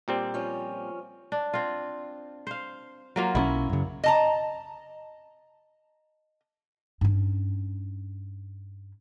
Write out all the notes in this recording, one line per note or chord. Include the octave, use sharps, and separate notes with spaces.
A#2 G3 C4
F3 C#4
D4
C4 F4
C5 F5
F#3 A#3 F4
B1 G3 C#4 E4
F#2 C#3
D#5 A5 A#5
G2 C#4